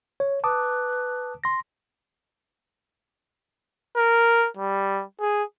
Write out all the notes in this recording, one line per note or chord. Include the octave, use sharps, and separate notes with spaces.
C#5
B4 A5 D6 D#6
C6 A#6
A#4
G3
G#4